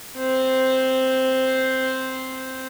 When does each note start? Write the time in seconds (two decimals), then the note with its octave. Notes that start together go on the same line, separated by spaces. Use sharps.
0.17 C4 C5